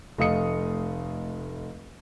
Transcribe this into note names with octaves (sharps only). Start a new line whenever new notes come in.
F1 A3 D#5 F5 D#6 C#7